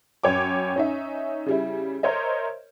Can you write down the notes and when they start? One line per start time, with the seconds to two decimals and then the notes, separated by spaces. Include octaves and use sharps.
0.23 F#2 C#5 G5 D6
0.76 C#4 D#4 E5
1.46 C#3 G3 E4
2.03 A#4 C5 C#5 D#5 E5